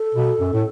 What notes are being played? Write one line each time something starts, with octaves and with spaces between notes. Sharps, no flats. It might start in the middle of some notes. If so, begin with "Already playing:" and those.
Already playing: A4
B2
F#2
A2